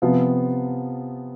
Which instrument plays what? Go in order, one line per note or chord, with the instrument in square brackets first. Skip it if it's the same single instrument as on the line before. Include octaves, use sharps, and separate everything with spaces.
[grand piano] C3 F3 B3 F4